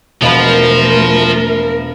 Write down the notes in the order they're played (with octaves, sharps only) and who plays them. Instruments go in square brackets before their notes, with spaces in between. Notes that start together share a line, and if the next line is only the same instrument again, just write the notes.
[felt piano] E1 F5 B5 [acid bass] B2 [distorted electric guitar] F3 [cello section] A3 A#4